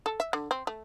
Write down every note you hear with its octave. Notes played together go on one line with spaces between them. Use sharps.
A4
E5
D3
C4
A3